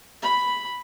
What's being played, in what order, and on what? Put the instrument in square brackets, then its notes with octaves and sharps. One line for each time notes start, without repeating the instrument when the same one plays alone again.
[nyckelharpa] B5